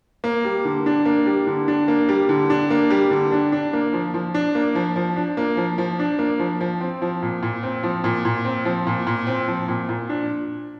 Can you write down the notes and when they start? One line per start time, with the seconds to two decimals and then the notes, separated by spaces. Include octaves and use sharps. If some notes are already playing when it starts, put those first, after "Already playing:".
0.24 A#3
0.45 G3
0.65 D3
0.86 D4
1.05 A#3
1.26 G3
1.47 D3
1.68 D4
1.88 A#3
2.09 G3
2.29 D3
2.50 D4
2.70 A#3
2.91 G3
3.11 D3
3.32 D4
3.52 D4
3.73 A#3
3.93 F3
4.14 F3
4.34 D4
4.55 A#3
4.75 F3
4.96 F3
5.16 D4
5.37 A#3
5.57 F3
5.78 F3
5.99 D4
6.19 A#3
6.39 F3
6.61 F3
6.81 C4
7.02 F3
7.22 A#2
7.43 A#2
7.63 C4
7.83 F3
8.04 A#2
8.25 A#2
8.45 C4
8.65 F3
8.87 A#2
9.07 A#2
9.27 C4
9.48 F3
9.68 A#2
9.89 A#2
10.09 D4